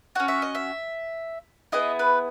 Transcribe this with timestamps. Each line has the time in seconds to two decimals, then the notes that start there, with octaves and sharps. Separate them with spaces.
0.15 C#4 F#4 F#5
0.28 E5
0.42 D#5
0.55 E5
1.72 B3 E4 G#4 D#5
1.99 B4